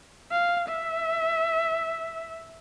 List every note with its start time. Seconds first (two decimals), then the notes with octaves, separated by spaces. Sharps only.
0.32 F5
0.69 E5